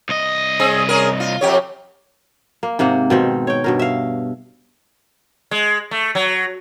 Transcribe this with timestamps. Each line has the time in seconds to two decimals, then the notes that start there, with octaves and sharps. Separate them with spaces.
0.09 C2 D#5
0.60 C4 G#4
0.89 C#4 G#4 A#4
1.20 F4
1.41 F2 G4 C#5
2.63 A#3
2.79 G#2 C3 A#3 F#5
3.10 B2 D#3 C4
3.47 C#5 G5
3.64 G2 B2 A#4
3.79 E5 F5
5.51 G#3
5.91 A3
6.15 F#3